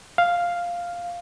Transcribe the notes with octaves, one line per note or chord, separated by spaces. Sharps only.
F5